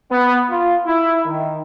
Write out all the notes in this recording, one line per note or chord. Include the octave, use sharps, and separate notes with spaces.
B3
F4
E4
D#3